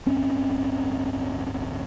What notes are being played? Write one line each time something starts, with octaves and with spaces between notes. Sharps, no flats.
D1 G1 C4 C#4